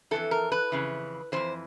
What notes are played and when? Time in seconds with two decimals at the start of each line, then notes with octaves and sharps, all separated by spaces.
0.11 F2 C#3 E3 A4
0.31 A#4
0.52 B4
0.72 F2 C#3 E3
1.32 C#3 E3 C5
1.36 F2